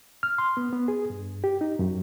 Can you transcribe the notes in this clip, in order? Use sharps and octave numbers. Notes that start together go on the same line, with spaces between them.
F6
C6
B3
B3
G#4
G2
G4
D#4
F#2